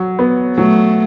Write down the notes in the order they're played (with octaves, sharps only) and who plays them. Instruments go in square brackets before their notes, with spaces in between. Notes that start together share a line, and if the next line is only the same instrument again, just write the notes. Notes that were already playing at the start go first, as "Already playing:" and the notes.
Already playing: [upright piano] F#3
B3
[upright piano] F#3 [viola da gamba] A3